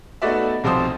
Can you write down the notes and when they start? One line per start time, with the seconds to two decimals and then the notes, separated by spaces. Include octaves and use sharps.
0.22 A3 B3 D#4 F#4 D5 E5
0.64 B1 C3 F3 F4 C5 D#6